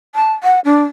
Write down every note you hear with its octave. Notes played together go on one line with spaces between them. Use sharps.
A5
F#5
D4